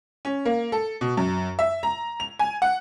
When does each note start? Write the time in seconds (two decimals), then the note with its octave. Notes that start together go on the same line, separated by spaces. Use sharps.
0.25 C#4
0.46 A#3
0.72 A4
1.01 B2
1.17 F#2
1.59 E5
1.83 A#5
2.20 F7
2.39 G#5
2.62 F#5